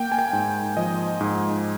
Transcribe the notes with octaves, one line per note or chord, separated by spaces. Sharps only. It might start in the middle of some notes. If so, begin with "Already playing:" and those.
Already playing: A#3 G5
G#5
G5
G#2
F3 D#5
G#2